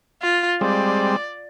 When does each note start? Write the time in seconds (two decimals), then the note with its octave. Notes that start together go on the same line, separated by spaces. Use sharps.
0.23 F4
0.61 G3 G#3 C4 D5